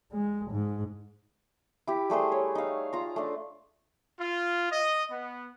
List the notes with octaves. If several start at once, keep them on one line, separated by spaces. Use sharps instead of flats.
G#3
G#2
E4 G4
G3 A3 G#4 C5
C#5
D#4 F5
F4 A#5
A3 D4
F4
D#5
B3